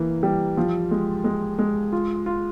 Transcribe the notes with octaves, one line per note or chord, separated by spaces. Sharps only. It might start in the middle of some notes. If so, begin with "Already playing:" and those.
Already playing: E3 A#3
G3
F3
G#3
G#3
G#3
F4
F4